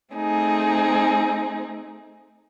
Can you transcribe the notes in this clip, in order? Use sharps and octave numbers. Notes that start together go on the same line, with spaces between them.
A3 C4 D#4 G#4